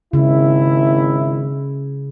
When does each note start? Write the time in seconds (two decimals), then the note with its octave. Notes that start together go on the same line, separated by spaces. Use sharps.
0.13 G#1 C#3 E4